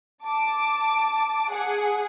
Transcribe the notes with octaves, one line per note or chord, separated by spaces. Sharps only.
A5 D6
G#4 F#5